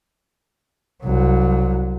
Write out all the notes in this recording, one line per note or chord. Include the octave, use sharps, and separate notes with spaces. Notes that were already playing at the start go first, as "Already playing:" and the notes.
C2 F#3